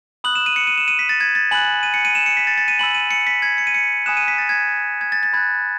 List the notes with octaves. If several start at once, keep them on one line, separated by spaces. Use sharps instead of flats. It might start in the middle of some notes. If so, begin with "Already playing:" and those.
B5 D#6 F#6 F#7
E7
D#7
C#7
D#7
E7
D#7
B6
A6
G#6
A6
G#5 B5 F#6 F#7
D#7
C#7
D#7
E7
C#7
B6
A6
A6
D#7
G#5 B5 E6 F#7
D#7
C#7
B6
G#6
C#7
D#7
C#7
G#5 B5 D#6 F#6 E7
D#7
B6
A6
G#6
G#6
A6
A6
B5 F#6 G#6